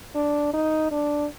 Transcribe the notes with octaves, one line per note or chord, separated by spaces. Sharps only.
D4
D#4
D4